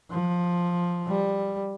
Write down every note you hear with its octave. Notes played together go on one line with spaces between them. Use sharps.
F3
G3